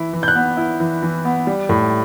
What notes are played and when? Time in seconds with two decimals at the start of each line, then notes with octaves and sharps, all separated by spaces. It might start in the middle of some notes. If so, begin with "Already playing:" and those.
Already playing: E3 E4
0.13 E3
0.23 G6
0.28 F#6
0.35 B3
0.57 E4
0.80 E3
1.03 E3
1.25 B3
1.47 G3
1.69 A2